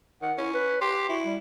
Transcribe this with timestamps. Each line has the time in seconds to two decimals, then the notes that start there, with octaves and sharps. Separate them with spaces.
0.22 D#3 F#5
0.38 C#4 E4
0.54 B4
0.81 G4 C6
1.09 E4 F#4
1.25 G3